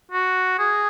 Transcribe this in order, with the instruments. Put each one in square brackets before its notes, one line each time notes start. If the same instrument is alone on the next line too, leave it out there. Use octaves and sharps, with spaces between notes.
[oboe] F#4
G#4